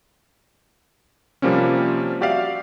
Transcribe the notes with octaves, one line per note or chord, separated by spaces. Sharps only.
C3 F3 G3 A#3 C4 C#4
F#4 G4 D5 E5 F5